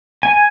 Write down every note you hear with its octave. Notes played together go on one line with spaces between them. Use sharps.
G#5